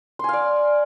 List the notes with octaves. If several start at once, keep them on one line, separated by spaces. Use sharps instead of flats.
D5 F5 G#5 C6